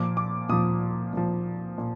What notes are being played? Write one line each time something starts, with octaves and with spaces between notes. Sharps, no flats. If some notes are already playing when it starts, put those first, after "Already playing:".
Already playing: A#2 F3 D6
D6
A#2 F3 D#6
A#2 F3
A#2